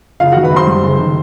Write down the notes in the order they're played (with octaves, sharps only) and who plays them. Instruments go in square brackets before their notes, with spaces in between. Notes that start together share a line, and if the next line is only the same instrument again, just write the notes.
[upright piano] F#1 [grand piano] F4 F5
[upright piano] D#3 [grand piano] F#4 F#5
[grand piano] B4 B5
[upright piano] F#2 [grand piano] C5 C6
[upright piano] G3
F#1
D#3